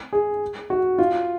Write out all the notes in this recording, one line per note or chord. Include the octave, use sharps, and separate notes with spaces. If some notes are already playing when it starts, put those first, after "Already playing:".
G#4
F#4
F4